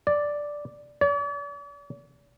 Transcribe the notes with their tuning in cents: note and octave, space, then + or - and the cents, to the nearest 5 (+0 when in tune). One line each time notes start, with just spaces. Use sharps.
D5 +0
D5 -45